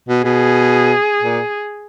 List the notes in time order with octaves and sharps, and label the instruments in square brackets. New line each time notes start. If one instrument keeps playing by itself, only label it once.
[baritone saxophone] B2
[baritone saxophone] B2 [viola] G#4
[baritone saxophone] A#2